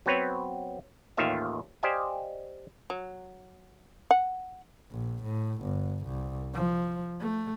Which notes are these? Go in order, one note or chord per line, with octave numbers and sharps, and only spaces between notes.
F#3 B3 C4 B4 C#5
A1 D#2 D#3 F4 E5 F5
G4 C5 D5 D#5 F5 G#5
F#3
F#5
A#1
A2
G1
C2
F3
A3